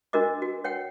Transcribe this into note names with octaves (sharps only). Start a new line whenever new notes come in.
D4 F#4 A#4 D#5 D6
F#4
C#5 F#5 G5